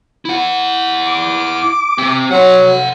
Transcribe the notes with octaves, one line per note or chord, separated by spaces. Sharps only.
E4 F#5
D6
C4 G4
F#3 F#5 C6